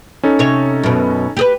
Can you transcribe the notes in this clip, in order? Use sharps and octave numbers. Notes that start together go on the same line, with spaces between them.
C#4 D#4 A4
C3 C#5
F#2 B2
G4 G#4 B4